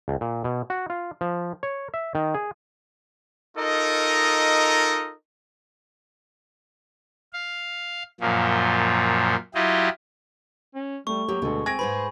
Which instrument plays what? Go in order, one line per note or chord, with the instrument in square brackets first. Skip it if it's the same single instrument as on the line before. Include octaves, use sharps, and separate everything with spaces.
[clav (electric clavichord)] C#2
A#2
B2
F#4
F4
F3
C#5
E5
D#3
G#4
[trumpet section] D#4 F4 A4 A#4 D#5
[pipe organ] F5
F#2 A#2 F3
F#3 E4 F4 G4 D#5
[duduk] C#4
[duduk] G3 [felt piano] A3 [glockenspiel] C#6
[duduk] F#3 [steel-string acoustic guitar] A#3 [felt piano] G4
[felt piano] D2 A4 [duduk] B2 [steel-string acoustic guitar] G#3
[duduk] C4 [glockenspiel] G#5 [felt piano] G#6 A#6 D7
[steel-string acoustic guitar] G#2 G#4 B4 [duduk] C5 [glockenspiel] B5